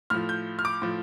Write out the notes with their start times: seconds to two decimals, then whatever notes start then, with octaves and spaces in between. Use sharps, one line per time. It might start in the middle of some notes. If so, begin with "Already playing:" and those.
0.10 A2 F3 F6
0.29 G6
0.59 F6
0.65 D6
0.82 A2 F3